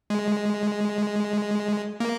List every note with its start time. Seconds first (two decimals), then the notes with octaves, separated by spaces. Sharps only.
0.10 G#3
2.00 A#3